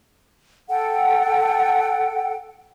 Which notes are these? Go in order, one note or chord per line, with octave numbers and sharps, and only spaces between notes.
A4 F#5 G5